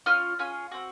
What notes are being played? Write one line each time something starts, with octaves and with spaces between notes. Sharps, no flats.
C#4 F4 F6
C#4 F4 G#4
C4 F#4